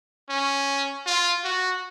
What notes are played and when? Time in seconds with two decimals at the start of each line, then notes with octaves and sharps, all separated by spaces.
0.30 C#4
1.06 F4
1.44 F#4